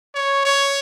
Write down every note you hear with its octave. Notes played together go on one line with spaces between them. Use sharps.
C#5
C#5